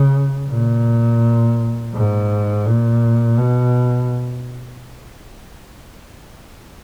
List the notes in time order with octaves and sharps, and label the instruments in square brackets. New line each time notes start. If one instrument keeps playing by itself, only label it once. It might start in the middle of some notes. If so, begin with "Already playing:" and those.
Already playing: [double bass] C#3
A#2
G#2
A#2
B2